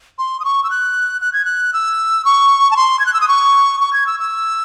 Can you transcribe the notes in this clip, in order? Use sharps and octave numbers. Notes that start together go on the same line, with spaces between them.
C6
D#6
C#6
E6
F#6
F#6
G#6
F#6
E6
C#6
A5
C6
G#6
F#6
E6
D#6
C#6
C#6
G#6
E6
E6